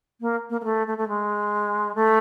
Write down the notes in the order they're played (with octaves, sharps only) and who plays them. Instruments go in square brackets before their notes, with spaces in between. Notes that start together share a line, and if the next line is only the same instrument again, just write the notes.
[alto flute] A#3
A#3
A#3
A3
A3
A3
G#3
A3